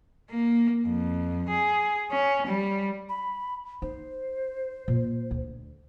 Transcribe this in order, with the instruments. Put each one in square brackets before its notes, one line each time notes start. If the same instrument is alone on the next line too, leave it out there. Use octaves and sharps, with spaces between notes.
[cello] A#3
F2
G#4
C#4
G3
[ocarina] B5
[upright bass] D#4 [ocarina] C5
[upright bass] A#2
D2